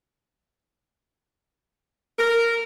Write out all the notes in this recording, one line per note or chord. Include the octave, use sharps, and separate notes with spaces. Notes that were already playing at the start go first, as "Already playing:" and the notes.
A#4